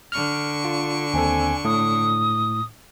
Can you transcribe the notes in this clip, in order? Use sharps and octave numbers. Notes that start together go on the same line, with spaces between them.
D3 C#6 F6
F4
D#2 C4 A4 G#5
A2 D#6